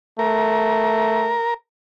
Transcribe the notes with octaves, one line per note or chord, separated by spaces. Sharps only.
A3 A#4